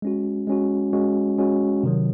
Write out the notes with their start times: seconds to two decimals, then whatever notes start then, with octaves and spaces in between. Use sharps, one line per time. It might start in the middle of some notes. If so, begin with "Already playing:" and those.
0.02 G#3 C#4 F#4
0.47 G#3 C#4 F#4
0.93 G#3 C#4 F#4
1.38 G#3 C#4 F#4
1.83 C3 D#3 F#3